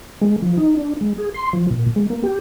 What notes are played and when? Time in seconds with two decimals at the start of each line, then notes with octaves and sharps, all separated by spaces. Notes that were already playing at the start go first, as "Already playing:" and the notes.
0.21 G#3
0.42 F3
0.57 D#4
0.77 D4
1.01 G#3
1.18 G#4
1.34 C6
1.53 F3
1.71 A#2
1.96 G#3
2.10 A#3
2.23 G4